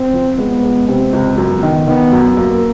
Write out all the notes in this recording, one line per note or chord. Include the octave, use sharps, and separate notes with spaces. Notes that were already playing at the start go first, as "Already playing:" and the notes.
Already playing: C4
F3
G#3 B3
G#3
C3 C4
C#2
F#2 B3
D#3
D#3 B3
F#2
F#2 A#3